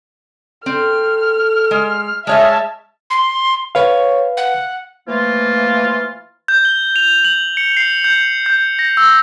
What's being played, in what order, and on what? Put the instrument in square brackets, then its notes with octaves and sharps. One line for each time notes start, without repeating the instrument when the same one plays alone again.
[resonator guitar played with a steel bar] C4 [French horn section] A4 [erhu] F6
[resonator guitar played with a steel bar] G#3
[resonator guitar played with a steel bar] G#3 C#5 D#5 [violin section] E5 A5 [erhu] F6
[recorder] C6
[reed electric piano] B4 F5 [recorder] C#5
[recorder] F#5
[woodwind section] E3 F3 A3 A#3 F4
[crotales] G6
G7
F7
F#7
C#7
C7
G6
G6
A#6
E6